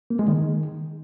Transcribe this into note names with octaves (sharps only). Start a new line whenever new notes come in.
A#3
G#3
D#3